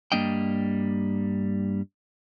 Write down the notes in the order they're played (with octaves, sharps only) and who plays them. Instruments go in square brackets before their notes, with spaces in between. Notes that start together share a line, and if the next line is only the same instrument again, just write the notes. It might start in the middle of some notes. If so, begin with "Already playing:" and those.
[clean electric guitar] G2 G3 A#3 D4 D#5 G5